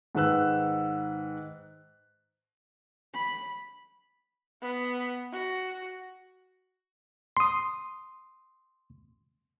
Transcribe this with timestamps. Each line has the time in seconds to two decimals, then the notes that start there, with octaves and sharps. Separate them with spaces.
0.15 G#2 D#3 B4 E6 F#6
3.14 B5
4.62 B3
5.32 F#4
7.37 C6 D#6